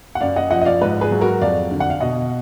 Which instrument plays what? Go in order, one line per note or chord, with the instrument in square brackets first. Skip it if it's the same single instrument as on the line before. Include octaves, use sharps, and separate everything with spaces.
[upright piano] F#5
F#2 D5 F5
D#5 F#5
F3 D#5 F#5
D#5
D5 F5
G#2 B4 D#5
G#4 B4
F#3
F#4 A#4
F2 D5 F5
D3
F#5
F5
B2 D#5 F#5